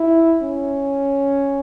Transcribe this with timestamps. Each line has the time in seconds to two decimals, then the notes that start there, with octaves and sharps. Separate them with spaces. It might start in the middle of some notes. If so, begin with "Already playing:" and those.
Already playing: E4
0.43 C#4